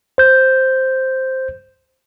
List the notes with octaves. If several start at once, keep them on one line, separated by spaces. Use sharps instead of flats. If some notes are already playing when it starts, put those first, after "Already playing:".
C5 G6